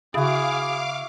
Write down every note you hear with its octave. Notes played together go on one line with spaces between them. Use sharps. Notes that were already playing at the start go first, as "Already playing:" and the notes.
C#3 E4 F#4 G#4 F5 D6